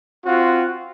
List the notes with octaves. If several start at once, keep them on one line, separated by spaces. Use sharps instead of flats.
C4 F4 F#4